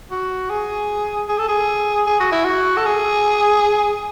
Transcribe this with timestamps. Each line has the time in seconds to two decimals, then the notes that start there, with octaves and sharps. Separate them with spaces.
0.11 F#4
0.50 G#4
1.29 G#4
1.39 A4
1.48 G#4
2.07 G#4
2.20 F#4
2.32 E4
2.45 F#4
2.77 A4
2.86 G#4